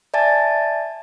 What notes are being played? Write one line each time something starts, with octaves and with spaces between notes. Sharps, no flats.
D5 E5 G#5 A5 A6